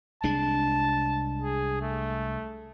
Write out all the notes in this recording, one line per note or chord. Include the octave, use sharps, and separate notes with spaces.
C2 G#3 D4 A5
G#4
A3